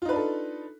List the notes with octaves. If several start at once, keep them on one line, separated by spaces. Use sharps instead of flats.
D4 D#4 F4 A4 B4